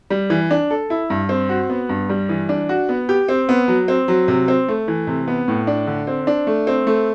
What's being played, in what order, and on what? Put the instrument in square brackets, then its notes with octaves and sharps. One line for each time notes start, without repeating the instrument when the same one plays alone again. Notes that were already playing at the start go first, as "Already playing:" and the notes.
[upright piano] G3
E3
D4
A4
E4
G2
C4
F#4
B3
G2
G3
E3
D4
F#4
B3
G4
C4
B3
F#3
C4
F#3
C3
C4
A3
E3
C3
B3
A2
D4
D3
C4
D4
A3
C4
A3